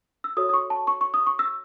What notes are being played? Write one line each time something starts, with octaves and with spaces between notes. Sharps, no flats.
E6
F#4 A4 C#5 D#6
D#6
C#6
A5
C#6
C#6
D#6
C#6
E6